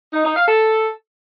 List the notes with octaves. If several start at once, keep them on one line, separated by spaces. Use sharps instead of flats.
D#4
D#4
F5
A4